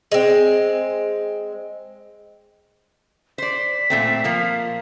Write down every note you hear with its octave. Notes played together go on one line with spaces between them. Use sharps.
G#3 C4
C5 D5 B6
A#2 A3 C4
F3 A#3